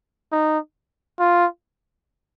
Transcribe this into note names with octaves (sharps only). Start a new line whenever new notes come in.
D#4
F4